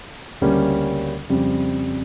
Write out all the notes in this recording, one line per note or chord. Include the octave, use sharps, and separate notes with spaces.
D2 C#3 G3 A#3 C#4
F2 C#3 G3